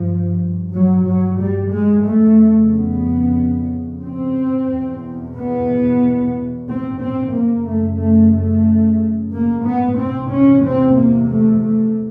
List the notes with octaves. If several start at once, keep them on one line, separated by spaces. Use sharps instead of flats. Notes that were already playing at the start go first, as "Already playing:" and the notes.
Already playing: G2 F3
F#3
F#3
G3
G#3
F2 C#3 A3
B3
C4
E2 B2
B3
C4
C4
F#2 C#3 A#3
A3
A3
A3
A#3
B3
E2 C3 C4
C#4
C4
A#3
A3
A3